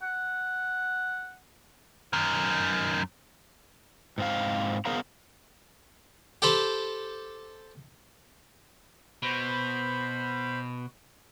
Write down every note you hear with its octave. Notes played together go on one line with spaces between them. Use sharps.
F#5
F#2 D#3
G#2 C4 F5
B3 G#4 A#4 C5 F5 A#5
G4 A4 C5 B5
B2 C5 B5